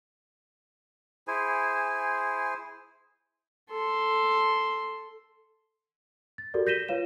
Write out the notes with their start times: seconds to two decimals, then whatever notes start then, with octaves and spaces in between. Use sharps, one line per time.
1.28 E4 G#4 C5 G#5
3.71 A4 C6
6.38 A6
6.54 F#4 G4 A4 A#4 D5
6.67 G6 A#6 B6 D#7 E7 G7
6.88 F4 B4 C#5 F5 E7